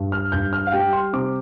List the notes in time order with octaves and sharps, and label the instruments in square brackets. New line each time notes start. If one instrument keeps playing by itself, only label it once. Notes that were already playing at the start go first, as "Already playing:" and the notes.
Already playing: [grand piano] G2
F6
G2 G6
F6
F5
G3 G5
C6
C3 D6